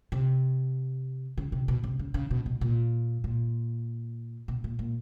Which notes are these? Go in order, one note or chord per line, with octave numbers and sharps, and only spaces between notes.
C3
C#3
C3
B2
C3
C#3
C#3
B2
B2
A#2
A#2
B2
A#2
A#2